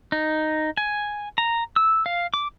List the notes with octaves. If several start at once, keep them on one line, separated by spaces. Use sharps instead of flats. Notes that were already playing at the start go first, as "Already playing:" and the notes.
D#4
G#5
A#5
E6
F5
D6